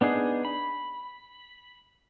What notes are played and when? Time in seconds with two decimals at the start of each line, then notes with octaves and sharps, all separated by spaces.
0.01 B3 D4 D#4 G#4
0.45 B5